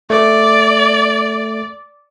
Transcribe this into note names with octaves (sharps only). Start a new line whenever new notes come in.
A3 D5